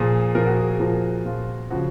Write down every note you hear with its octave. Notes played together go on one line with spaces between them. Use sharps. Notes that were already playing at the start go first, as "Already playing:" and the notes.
Already playing: A#2 F3 G#4
A#2 F3 A#4
F#4
G#4
G#4
A#2 F3 A#4
A#2 F3 F4
C#3 F3 F#4